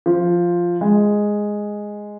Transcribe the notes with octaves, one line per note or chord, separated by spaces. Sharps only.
F3
G#3